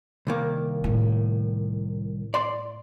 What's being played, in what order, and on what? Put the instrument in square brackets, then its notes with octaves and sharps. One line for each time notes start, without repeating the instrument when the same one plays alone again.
[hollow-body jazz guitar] C2 D#3 A#3
[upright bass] A2
[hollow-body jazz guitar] D5 C6